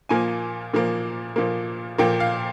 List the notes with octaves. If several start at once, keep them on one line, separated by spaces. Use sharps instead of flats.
A#2 F3 A#3 G#5
A#2 F3 A#3
A#2 F3 A#3
A#2 F3 A#3 G5
F5